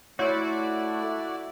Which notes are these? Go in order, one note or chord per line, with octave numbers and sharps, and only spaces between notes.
A3 E4 F#4 C#5 D5 F#5 C6